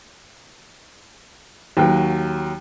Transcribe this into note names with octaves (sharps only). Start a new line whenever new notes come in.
D#2 F#3